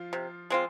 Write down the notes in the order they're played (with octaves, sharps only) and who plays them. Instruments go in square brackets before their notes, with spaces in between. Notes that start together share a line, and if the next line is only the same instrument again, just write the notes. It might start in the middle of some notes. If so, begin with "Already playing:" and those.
Already playing: [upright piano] F3 F4
[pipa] C3
G#3 C4 F4